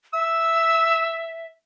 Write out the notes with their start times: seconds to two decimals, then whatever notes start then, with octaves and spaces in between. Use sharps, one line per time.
0.13 E5 E6